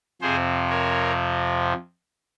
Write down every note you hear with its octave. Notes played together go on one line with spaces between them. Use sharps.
F2 C3 F3 G#4 C5
A#4 C#5